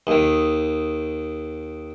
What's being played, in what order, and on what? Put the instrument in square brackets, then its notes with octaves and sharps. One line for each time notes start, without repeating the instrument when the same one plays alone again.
[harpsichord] D#2 D#3